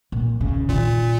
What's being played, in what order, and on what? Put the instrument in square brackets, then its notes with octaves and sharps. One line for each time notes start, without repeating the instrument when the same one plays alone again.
[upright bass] A#2
C#3
[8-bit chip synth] A#2 [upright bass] D#3